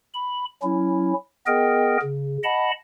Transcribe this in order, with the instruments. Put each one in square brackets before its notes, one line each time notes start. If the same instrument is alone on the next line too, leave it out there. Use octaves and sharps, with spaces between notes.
[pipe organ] B5
F#3 C#4 E4
B3 G#4 A#4 D#5 G5
C#3
D#5 F#5 A5 B5